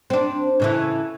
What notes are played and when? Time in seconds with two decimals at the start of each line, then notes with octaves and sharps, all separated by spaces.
0.10 C4 D4
0.60 A2 C#3 E3